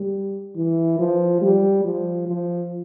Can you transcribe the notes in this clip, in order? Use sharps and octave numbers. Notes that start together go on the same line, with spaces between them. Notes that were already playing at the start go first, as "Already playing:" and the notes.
Already playing: G3
E3
F3
G3
F3
F3